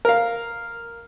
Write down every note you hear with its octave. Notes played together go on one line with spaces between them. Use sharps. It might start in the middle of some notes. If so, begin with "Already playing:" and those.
A#4 F5